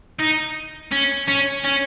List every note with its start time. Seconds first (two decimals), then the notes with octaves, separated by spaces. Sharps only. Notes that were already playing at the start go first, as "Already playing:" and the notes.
0.20 D#4
0.92 C#4
1.28 C#4
1.65 C#4